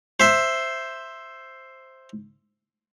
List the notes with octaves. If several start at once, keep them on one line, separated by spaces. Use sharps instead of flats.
C5 E5 C6